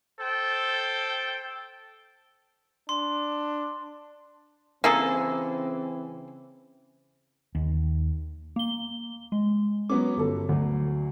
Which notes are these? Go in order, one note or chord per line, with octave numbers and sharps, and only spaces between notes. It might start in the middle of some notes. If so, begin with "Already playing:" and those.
A4 C5 G5
D4 C6
C#3 E3 A#3 C4 G#4 A4
D#2
A#3 G7
G#3
F#3 B3 C#4 D6
G1 A4
D2 D3 F#3